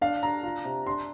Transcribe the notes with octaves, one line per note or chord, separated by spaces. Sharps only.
D4 F5
D4 A#5
F4
C3
D4 C6